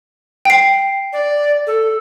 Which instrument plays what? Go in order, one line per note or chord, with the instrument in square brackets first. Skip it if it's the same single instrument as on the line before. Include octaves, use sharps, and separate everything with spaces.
[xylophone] G5 C7
[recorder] D5
A4